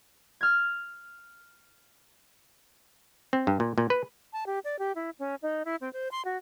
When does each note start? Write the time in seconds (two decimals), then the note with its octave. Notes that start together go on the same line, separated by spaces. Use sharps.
0.41 F6 G#6
3.33 C4
3.47 G2
3.60 A#2
3.78 A#2
3.90 B4
4.33 A5
4.46 G4
4.64 D5
4.79 G4
4.95 E4
5.19 C#4
5.42 D#4
5.65 E4
5.81 C4
5.93 C5
6.11 C6
6.25 F#4